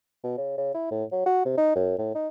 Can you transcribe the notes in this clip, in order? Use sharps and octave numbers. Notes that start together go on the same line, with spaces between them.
B2
C#3
C#3
E4
A2
F#3
F#4
C3
D#4
F#2
A2
D#4